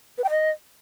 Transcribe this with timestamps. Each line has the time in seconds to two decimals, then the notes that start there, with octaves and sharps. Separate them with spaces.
0.18 B4
0.24 G5
0.30 D#5